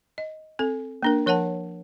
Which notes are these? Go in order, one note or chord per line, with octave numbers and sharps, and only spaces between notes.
D#5
C4 A4
A#3 D4 A#4
F3 A#4 C#5 F#5 A5